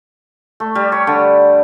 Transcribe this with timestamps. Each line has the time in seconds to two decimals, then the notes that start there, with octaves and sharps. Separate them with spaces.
0.60 A3
0.75 G3
0.92 C#5
1.07 D3